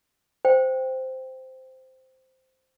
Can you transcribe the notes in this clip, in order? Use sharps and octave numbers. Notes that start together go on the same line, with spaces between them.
C5 G5